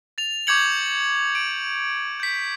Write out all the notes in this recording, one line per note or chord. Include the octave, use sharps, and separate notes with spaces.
A6 F7
C#6 D6 G6 G#6 C#7 F#7
D7
G6 B6